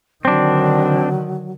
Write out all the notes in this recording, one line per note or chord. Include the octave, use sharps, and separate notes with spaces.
D3 D#3 F#3 C4 D4